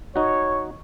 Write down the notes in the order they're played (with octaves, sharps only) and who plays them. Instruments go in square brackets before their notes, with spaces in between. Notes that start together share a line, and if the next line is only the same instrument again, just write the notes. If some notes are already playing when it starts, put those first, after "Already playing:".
[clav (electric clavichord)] D#4 F#4 [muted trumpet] C#5